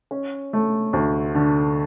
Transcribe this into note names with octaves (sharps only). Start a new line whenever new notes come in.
C#4
A3
D2
D3